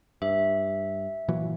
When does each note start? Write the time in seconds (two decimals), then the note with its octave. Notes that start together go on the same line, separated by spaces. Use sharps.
0.22 G2 E5
1.28 A#2 E3 F#3